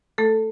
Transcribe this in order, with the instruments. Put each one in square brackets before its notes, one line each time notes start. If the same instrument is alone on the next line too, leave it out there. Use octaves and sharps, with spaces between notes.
[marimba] A3 A4